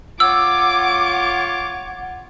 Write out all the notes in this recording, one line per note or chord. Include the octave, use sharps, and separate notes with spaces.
F4 C#5 F#5 D6 E6